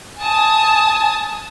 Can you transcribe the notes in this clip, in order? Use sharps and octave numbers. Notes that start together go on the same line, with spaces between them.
G#5 A5 D#6